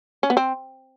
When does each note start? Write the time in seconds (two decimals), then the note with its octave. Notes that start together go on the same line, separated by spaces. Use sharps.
0.23 C#4
0.30 B3
0.37 C4